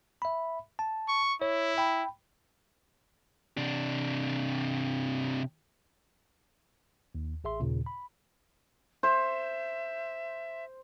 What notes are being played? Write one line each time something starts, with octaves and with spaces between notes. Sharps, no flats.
E5 B5
A5
C#6
E4 C#5
G5 B5
C3 D4
D#2
A1 G#4 E5 C6
D#2 A#2 C#3
B5
C5 E5